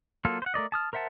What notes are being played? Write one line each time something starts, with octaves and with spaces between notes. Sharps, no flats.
F#3 A#3 F4 A4
C5 F#5
A3 A#4 D5 D#5
A5 D#6 F6
A#4 C5 E5 F#5 A5